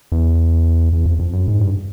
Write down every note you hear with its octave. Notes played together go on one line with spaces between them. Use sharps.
E2
E2
F2
F2
F#2
G#2
G2